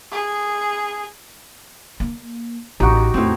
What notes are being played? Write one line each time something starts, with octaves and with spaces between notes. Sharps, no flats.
G#4
A#3
A1 D#4 F#4 G4
E2 A2 C4